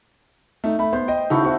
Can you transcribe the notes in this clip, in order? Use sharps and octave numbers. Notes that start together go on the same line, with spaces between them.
A3 D#4
A3 B5
B3 C5
D#5 G5
C#3 D#4 E4 F#4 A4
A3 C4 F#4